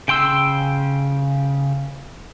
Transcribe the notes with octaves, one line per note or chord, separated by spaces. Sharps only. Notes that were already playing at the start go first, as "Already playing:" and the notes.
C#3 G5 C6 E6